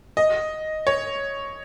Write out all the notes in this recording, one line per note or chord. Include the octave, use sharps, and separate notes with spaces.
D#5
C#5